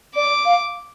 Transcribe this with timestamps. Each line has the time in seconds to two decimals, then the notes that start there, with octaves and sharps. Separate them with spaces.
0.16 D5 D6
0.45 F5